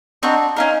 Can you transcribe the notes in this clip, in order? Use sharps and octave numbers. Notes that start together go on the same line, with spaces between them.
C4 D4 D#4 F#4
C#4 D#4 F4 A#4